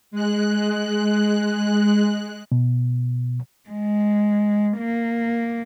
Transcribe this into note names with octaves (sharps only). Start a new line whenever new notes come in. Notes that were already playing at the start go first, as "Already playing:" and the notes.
G#3 F#6
B2
G#3
A#3